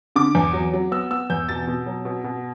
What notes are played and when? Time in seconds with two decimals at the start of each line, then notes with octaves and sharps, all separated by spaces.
0.16 D3 D6
0.35 E2
0.53 F#3
0.73 F#3
0.91 B3 E6
1.11 B3 E6
1.30 E2 G6
1.49 B2 A6
1.67 B2
1.86 F#3
2.05 B2
2.24 B2